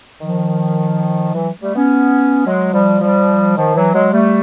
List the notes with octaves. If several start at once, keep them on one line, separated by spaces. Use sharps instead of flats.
D#3 F3
E3 F#3
G3 A3
B3 C#4
F#3 G#3
F3 G3
F3 G3
D#3 F3
E3 F#3
F#3 G#3
G3 A3